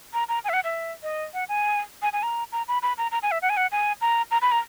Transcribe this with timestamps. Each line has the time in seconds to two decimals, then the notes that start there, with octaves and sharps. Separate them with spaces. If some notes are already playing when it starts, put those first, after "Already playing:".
0.14 A#5
0.29 A#5
0.44 G#5
0.49 E5
0.53 F#5
0.64 E5
1.03 D#5
1.34 F#5
1.49 G#5
2.02 G#5
2.13 G#5
2.23 A#5
2.52 A#5
2.68 B5
2.83 B5
2.98 A#5
3.12 A#5
3.23 G#5
3.31 E5
3.42 F#5
3.50 G#5
3.57 F#5
3.72 G#5
4.01 A#5
4.31 A#5
4.42 B5
4.52 A#5